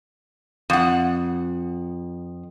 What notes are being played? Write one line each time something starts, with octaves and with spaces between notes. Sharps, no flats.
F2 F#5